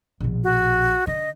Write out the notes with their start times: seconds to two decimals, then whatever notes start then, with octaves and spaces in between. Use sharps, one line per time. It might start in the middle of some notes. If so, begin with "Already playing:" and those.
0.20 A#1 B2
0.44 F#4
1.07 D3 D#5